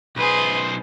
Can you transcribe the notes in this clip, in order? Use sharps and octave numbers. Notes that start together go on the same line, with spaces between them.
B1 G#4 B4 C5